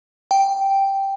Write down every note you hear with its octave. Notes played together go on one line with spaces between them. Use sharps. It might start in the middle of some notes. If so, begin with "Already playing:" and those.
G5